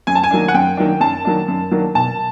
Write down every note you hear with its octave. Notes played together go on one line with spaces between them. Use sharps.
F#2 G#5
A5
G#5
D#3 F#3 A#3 D4
F#5
F#2 G5
D#3 F#3 A#3 D4
F#2 A5
D#3 F#3 A#3 D4
F#2
D#3 F#3 A#3 D4
B2 A5